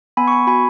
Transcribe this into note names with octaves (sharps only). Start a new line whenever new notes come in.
B3 G#5 B5
C#6
G#5 B5
F#4 G#5 B5